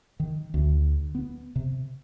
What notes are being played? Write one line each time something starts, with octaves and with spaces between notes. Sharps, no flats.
D#3
D2
B3
C3